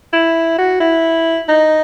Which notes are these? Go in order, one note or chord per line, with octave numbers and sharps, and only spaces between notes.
E4
F#4
E4
D#4